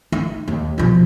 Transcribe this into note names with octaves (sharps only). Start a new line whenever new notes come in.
D#4
D#2
B2 F3